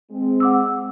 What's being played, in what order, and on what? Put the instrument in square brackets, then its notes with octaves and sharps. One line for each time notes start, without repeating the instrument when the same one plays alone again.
[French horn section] G#3 C4
[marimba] F#5 D6 E6